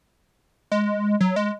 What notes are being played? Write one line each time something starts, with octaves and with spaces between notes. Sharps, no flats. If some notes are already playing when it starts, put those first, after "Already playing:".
G#3
F#3
G#3